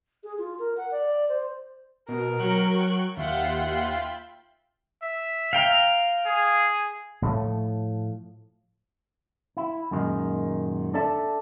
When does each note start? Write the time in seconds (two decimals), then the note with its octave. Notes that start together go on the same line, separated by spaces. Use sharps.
0.24 G#4
0.38 F4
0.59 A#4
0.77 F#5
0.91 D5
1.29 C5
2.09 B2 A#4
2.40 F#3 G5 C#6 F#6
3.17 D#2 F4 E5 F#5 G5 B5
3.69 F4
5.03 E5
5.53 F5 G5 A#5
6.26 G#4
7.22 A2 F3 A3
9.57 E4
9.91 F#2 A#2 D#3 G#3
10.94 D4 A4 D5 E5 A5